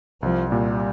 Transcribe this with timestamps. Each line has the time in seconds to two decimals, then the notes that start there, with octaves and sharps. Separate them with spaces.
0.22 C2 F3
0.51 A#2 G3